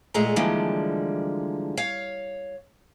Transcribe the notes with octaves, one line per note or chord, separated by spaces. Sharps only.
E2 A#2 G#3 A3 G#4 A#5
D3 E3 F3 G3 G#3 A#3
C#5 F5